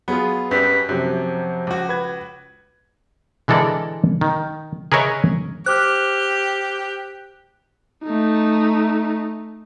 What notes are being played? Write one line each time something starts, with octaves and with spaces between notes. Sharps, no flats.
F#3 B3 F4 G#4
F#2 G3 B4
F#2 C3 F3 F#3 G4
C#2 F#4
B4 G#6
D3 E3 G#3 A4 A#4 D5
D#3
G#4 A#4 B4 C#5 D#5 E5
G4 C5 D6 F6 F#6
A3 D#4